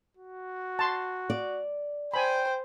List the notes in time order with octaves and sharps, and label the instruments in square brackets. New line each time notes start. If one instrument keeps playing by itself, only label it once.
[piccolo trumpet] F#4
[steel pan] A5 C6
[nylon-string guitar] D5
[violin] C5 [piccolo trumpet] G5 [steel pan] G#5 B5